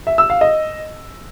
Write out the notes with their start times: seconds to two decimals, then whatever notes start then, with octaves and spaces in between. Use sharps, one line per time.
0.07 E5
0.18 E6
0.30 F5
0.41 D#5